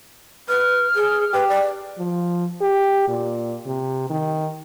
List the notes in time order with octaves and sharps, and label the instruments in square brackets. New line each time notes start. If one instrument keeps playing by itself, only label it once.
[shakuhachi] B4 [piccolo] F6
[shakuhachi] G#4
[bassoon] G4 [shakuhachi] B4
[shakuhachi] D5
[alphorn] F3
G4
A#2
C3
D#3